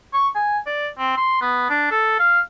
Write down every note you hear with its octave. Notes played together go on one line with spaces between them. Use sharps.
C#6
G#5
D5
C4
C6
B3
D4
A4
F5